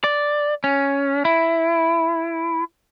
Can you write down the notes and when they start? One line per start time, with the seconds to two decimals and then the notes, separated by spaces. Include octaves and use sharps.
0.04 D5
0.64 C#4
1.25 E4